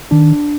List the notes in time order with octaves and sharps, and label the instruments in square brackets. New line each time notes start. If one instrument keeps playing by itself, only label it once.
[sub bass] D#3 [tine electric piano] D4